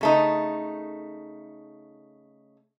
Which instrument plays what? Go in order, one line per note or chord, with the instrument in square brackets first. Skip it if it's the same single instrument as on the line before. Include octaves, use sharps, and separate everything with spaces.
[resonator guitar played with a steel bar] C#3 A3 D#4